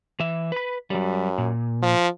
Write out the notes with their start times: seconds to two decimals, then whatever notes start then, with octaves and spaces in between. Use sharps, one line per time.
0.20 E3 E5
0.52 B4 B5
0.90 F#2 F#3 G3
1.38 A#2
1.82 F3